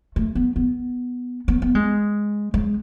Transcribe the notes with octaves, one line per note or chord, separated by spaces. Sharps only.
A3
B3
B3
B3
B3
G#3
G#3